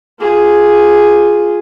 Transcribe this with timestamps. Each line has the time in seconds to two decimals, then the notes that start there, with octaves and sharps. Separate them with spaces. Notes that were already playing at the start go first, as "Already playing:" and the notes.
0.20 F4 G#4